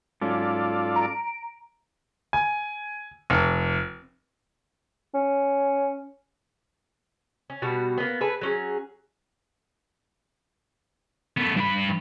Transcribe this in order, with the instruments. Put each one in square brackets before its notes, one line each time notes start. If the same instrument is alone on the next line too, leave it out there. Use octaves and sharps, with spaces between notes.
[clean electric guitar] G#2 F#3 C#4 [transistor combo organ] F4 A4 D5
[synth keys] A#5 D7
[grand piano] G#5
F1
[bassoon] C#4
[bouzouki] C#4
B2 G3 F#4
A#3 B3
G#4 A4 B4
F#3 C#4 G#4
[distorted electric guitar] A3 B3
G2 B5